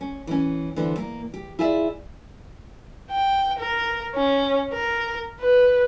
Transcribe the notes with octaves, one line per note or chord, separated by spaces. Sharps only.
C#4
E3 C#4
D3 E3 B3 C5
A#3
G4
E4 F4 G#4 D5 E5
G5
A#4
C#4
A#4
B4